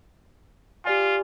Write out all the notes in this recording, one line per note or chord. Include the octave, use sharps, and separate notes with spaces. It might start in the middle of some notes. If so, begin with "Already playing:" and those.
F4 G4 D5 G#5